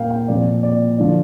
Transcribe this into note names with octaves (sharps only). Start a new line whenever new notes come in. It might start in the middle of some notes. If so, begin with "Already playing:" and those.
Already playing: A#2 A#3 F5 G5
G5
A#2 F3 C4 D5
D5
D3 F3 D5